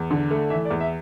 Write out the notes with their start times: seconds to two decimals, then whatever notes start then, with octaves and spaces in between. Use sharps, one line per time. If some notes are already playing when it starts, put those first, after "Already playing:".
Already playing: E2
0.11 D3
0.30 A3
0.50 E3 E5
0.65 D5
0.71 E2
0.80 E5